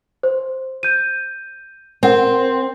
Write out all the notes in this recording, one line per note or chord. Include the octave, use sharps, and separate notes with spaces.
C5
G6 D#7
C4 A#4 F#5